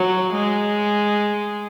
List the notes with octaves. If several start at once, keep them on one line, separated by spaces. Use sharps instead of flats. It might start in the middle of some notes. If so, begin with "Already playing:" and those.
Already playing: F#3
G#3